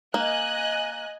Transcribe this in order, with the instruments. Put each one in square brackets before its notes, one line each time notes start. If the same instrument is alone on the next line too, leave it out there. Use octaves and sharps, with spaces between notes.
[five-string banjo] A#3 [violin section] D#5 G#5 F#6